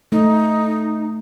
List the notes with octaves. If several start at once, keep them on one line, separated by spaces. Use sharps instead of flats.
A3 D#4